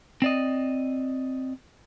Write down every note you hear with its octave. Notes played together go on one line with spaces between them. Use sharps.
C4 D5 D#5